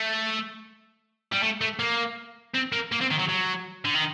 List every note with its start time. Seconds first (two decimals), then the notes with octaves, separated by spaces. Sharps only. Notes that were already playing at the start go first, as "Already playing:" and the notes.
Already playing: A3
1.32 G3
1.43 A3
1.61 A3
1.79 A#3
2.55 C4
2.73 A#3
2.92 A#3
3.01 C4
3.11 D#3
3.19 F#3
3.29 F#3
3.85 D3
3.95 D#3